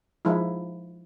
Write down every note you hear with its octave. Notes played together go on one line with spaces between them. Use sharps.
F3 G#3 D#4 E4